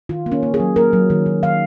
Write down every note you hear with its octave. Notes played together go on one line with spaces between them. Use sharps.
D#3 F4
A#3
C#4
A#3
G#4
F#3
A#3 A#4
F#3
D#3
D#3
D#3 F5